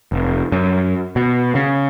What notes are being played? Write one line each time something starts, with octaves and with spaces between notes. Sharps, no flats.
F1
F#2
B2
C#3